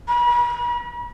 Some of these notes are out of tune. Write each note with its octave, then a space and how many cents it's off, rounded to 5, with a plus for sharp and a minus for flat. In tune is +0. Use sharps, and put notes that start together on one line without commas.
B5 -45